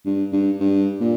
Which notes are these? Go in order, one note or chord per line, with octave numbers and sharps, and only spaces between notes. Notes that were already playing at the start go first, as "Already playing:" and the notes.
G2
G2
G2
A#2